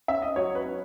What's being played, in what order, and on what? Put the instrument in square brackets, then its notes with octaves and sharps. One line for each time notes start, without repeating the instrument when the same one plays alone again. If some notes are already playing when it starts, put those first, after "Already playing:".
[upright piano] C#4 E5
D#5
F#3 C#5
B4
C#4